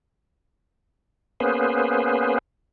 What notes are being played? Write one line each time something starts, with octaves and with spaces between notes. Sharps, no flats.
A#3 B3 C#4 G#4 B4 C5